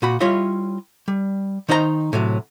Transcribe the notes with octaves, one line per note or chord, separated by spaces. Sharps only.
A#2 F#4 B5
G3 E4 F4 C#5 D#5 E5
G3
D#3 D#4 C5 D#5 A#5
A2 C3 F#3